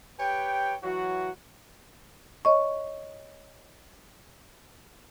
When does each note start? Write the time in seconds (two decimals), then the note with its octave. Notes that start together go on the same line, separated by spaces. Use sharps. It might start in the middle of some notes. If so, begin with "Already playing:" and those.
0.19 G4 B4 C#5 G5
0.83 E3 F#3 F#4
2.45 C#5 D#5 C#6